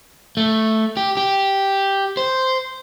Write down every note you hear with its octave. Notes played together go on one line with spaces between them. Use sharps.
A3
G4
G4
C5